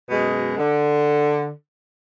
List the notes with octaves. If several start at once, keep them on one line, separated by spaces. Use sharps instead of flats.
F#2 B2 G#3
D3